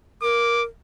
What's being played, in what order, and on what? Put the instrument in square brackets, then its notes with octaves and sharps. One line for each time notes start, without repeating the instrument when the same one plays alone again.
[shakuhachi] A#4 [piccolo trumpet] D6